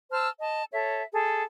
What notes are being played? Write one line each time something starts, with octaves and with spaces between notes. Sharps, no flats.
C5 A5 E6 F6
D#5 A5
A4 C#5 E5
G#4 A4